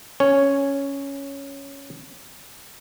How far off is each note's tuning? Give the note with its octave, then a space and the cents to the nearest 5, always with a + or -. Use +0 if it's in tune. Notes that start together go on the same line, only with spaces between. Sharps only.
C#4 +0 C#5 +0